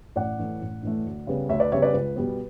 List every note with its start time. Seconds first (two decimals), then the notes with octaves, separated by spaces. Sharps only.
0.16 A1 D5 F#5
0.39 A2 E3 A3
0.61 A1
0.83 A2 E3 A3
1.06 D2
1.27 C#3 G3 B3
1.49 D2 C#5 E5
1.60 B4 D5
1.72 C#3 G3 B3 C#5 E5
1.82 B4 D5
1.93 C#2 B4
2.16 B2 G3 B3